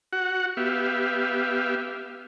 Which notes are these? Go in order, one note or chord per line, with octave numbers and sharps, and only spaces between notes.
F#4 F#5
B3 G4 E5 F5